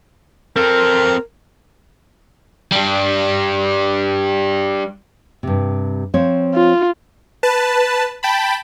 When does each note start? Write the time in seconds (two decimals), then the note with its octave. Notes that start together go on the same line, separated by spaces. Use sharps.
0.56 C4 A4 A#4
2.72 G3 D4
5.43 G2 C3
6.14 F3 C4 C#5
6.55 F4
7.43 B4 A5
8.23 G5 A5 B5